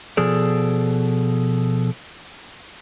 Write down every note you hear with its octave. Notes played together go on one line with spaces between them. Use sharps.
B2 F3 G#4 A4 D5